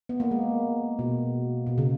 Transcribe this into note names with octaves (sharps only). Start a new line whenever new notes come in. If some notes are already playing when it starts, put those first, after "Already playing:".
B3
A#3
G#3
B2
B2
C#3